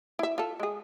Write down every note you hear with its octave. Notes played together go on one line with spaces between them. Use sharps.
E4 E5
F4 A4
G#3 G#4